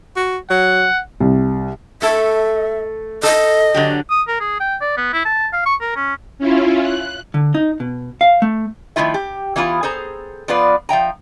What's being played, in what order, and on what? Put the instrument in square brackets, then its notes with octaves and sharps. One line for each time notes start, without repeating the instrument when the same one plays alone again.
[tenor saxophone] F#4
[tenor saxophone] F#3 [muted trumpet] F#5
[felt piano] C2
[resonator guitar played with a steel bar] A3 A4 [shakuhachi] E5
[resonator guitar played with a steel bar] A4 [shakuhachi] D#5
[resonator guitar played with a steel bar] D3 F#3 G4
[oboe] D#6
A#4
G#4
G5
D5
B3
E4
A5
F5
C#6
A#4
C#4
[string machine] C#4 E4 F4
F#6
[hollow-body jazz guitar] D3
D#4
B2
F5
A3
[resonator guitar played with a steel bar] D#3 F3 A3 E4 F4 E5
G4
E3 B3 E4 F4
G#4 A4 C5 A#5
F3 B3 F4 B4 D5
F3 E5 G5 A#5